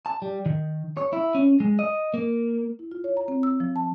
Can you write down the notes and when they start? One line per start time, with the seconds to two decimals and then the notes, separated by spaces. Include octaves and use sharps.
0.06 A5
0.22 G3
0.46 D#3
0.97 C#5
1.13 E4
1.35 C#4
1.60 G#3
1.79 D#5
2.14 A#3
2.79 E4
2.92 F4
3.04 C#5
3.17 A#5
3.28 C4
3.43 E6
3.60 F3
3.76 A5